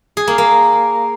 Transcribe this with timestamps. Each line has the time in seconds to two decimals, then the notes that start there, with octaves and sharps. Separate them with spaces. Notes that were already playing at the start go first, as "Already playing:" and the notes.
0.17 G#4
0.27 A#3
0.38 A#3